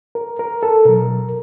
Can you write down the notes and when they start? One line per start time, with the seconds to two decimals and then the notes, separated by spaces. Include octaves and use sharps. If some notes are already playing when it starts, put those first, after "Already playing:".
0.15 A#4
0.39 A#4
0.63 A4
0.85 B2 F#3 A#4